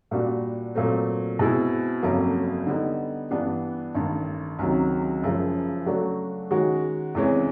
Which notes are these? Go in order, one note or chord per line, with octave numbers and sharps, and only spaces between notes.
A#2 G3 A#3 D4 F#4
A#2 F#3 A3 C4
B2 G#3 C4 E4 G#4
G1 F2 C#3 F#3 A#3
D3 G3 B3 D#4
G2 E3 G3 B3 D4
A1 G2 D#3
C#2 C3 D#3 F#3
F#1 F#2 C#3 F3 G#3
C#3 F#3 A3 D4 F#4
D#3 G#3 C#4 F#4
E2 C3 E3 G#3 C#4